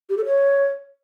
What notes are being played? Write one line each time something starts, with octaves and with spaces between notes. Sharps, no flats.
G4
A4
C#5